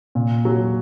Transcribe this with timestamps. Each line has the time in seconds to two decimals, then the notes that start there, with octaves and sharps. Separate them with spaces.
0.15 A#2
0.45 F#3